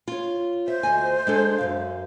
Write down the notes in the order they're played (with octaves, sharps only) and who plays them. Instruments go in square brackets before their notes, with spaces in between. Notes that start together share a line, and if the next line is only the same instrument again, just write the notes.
[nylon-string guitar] F4 C#5
[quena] C5 [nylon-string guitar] E5
[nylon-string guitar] D2 D#5 G#5
G#3 D4 A4
F#2 B2 F5